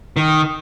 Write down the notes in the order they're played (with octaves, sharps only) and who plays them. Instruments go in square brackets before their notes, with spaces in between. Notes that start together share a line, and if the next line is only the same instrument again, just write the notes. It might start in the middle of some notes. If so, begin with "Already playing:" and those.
[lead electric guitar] D#3